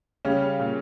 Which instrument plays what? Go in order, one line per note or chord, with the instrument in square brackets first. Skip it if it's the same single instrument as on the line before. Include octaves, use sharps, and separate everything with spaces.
[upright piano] C#3 G3 C#4
A#2